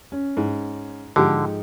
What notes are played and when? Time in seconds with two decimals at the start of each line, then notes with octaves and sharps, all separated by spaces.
0.12 C#4
0.37 G#2
1.16 G#2 D3 F3 G4 A4